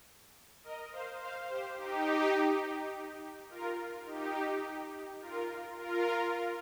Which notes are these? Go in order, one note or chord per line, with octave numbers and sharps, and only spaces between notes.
A#4 D#5
C5 F5
C5 F5
G4 C5
D#4 G4
F4 A#4
D#4 G4
F4 A#4
F4 A#4